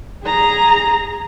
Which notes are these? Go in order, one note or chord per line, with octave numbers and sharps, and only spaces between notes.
G#4 A#5